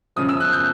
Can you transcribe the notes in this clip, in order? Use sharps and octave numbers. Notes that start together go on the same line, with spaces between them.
F#2 C#3 F3 D#6
E6
F#6
G6